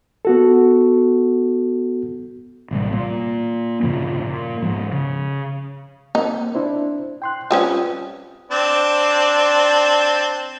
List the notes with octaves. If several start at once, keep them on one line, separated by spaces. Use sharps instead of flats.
B3 F#4 A4
A1 C3 G3
A#2
G2 A#2 C#3 F3
A#2
G#2 F3
C#3
A#3 C4 D#4
D4 E4 C5
G5 C6 F#6
G3 C4 C#4 F4 B4 D#6
C4 D4 D5